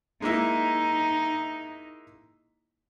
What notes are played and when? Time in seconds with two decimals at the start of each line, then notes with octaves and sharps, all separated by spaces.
0.22 G#3 A#3 D#4 E4